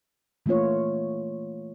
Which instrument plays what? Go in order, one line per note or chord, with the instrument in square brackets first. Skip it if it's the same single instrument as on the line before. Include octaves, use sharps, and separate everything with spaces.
[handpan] E3 A3 A#3 F4 C#5